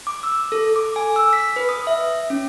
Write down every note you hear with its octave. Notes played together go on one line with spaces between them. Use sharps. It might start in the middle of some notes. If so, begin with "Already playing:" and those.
D6
E6
A4
D6
G#5
E6
B6
B4
D#6
E5
C#4